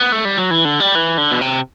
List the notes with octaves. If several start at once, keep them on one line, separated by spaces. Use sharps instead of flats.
B3
A3
G3
F#3
E3
D3
G3
E3
D3
B2
C3